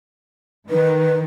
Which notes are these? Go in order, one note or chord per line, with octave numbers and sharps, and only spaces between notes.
D#3 B4